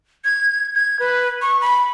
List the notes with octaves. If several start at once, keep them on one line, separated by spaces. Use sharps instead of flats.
G#6
G#6
B4
C#6
B5